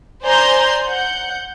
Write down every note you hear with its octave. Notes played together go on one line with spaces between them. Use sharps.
C5 D5 G#5 A#5 C6 G6
F#5 G6